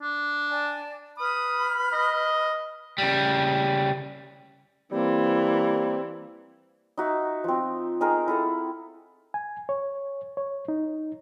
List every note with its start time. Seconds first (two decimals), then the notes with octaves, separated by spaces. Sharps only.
0.02 D4
0.51 D5 G#5 A5
1.18 B4 B5 D#6 F6
1.93 D#5
2.98 C#3 G3
4.92 E3 G3 A#3 C4
6.98 D#4 F#4 E5
7.44 F3 C4
8.00 C4 D#4 G#4 A#4
8.28 E4 A4 F#5
9.34 G#5
9.69 C#5
10.37 C#5
10.68 D#4